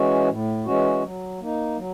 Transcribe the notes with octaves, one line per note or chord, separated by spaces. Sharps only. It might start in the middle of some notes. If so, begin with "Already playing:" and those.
Already playing: E3 G#3 C#4 F#4
A2
E3 G#3 C#4 F#4
F#3
A#3 D#4
F#3